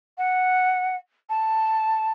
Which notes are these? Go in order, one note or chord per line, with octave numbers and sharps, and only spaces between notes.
F#5
A5